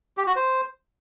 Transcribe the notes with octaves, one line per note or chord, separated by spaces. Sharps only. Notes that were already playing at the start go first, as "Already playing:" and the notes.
G4
F#4
C5